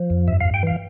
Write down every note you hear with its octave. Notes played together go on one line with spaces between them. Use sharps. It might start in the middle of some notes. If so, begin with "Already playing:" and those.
Already playing: F3
F2
G2 E5
F5
G2
G5
E3 F5